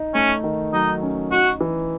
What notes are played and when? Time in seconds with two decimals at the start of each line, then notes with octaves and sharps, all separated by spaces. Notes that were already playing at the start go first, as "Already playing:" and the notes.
Already playing: D#4
0.14 A3 C#4
0.44 D#3
0.73 F#3 D#4
1.02 C#4
1.31 D#4 F#4
1.61 E3